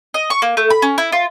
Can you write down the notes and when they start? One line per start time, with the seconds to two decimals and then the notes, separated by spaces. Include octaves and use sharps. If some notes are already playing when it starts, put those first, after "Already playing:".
0.14 D#5
0.30 C#6
0.42 A#3
0.57 A3
0.70 B5
0.82 C#4
0.98 E4
1.12 F4